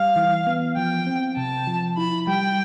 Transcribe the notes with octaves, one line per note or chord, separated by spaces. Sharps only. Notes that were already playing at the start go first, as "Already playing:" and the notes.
Already playing: G3 F5
E3
B3
F3 G5
C4
C3 A5
F3
E4 B5
G3 G5